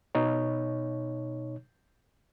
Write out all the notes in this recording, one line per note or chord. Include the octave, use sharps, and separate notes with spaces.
B2 D#4 C#5